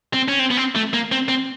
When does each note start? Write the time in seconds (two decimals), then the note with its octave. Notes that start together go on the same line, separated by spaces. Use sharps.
0.13 C4
0.28 C#4
0.39 C4
0.51 B3
0.57 C4
0.75 A3
0.93 A#3
1.12 C4
1.28 C4